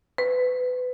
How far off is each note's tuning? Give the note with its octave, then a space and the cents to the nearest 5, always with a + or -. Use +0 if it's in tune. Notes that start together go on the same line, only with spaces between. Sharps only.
B4 +25